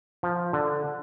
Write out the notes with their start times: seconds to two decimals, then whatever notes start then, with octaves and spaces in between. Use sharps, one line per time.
0.23 F3
0.53 D3